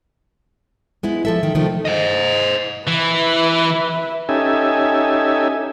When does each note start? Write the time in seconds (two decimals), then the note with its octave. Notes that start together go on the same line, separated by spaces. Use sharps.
1.03 G#3 B3 E4
1.25 F3 A4 E5
1.43 D#3
1.55 C3 D#3 F3 A3
1.85 C5 D#5
2.88 E3 B4 E5
4.29 C#4 D#4 G4 A4 E5 G#5